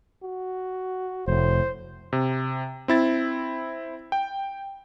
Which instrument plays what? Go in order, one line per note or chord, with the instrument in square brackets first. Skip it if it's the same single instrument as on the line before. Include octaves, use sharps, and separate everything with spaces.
[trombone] F#4
[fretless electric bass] F1 [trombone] A2 [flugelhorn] C5
[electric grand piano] C3
C4 E4 A6
G5